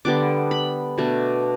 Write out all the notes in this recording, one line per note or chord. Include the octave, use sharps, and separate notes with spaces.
D3 G3 B3 D4 D6
B5
B2 A3 D4